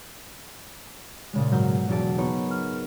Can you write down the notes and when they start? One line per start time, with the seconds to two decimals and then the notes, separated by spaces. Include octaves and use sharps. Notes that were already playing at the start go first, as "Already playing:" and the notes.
1.33 A#2 C#3 G#3
1.51 G#2 F#3 A#4 G6
1.66 B2
1.89 E1 F#3 G#4 A5 D7
2.18 B3 D#4 A#4 C#5
2.51 F6